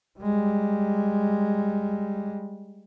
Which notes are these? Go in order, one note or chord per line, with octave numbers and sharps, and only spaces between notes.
G3 G#3